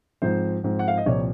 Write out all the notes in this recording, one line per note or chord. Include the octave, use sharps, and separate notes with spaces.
G#2 F3 C4 C5
G#2 F3 C4
F#5
F5
D#5
C2 A#2 F3 C4 C#5